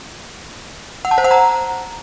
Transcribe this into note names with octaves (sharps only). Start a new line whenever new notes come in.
F#5
A5
C5
F#5
A#5